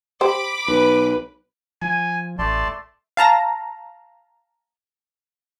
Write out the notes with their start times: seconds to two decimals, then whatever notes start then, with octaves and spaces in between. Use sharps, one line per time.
0.21 G4 C5 B5 D6
0.68 B1 B4
1.82 F3 G#5
2.39 A1 A3 D5 A5 C6
3.17 F5 A5 A#5 A#6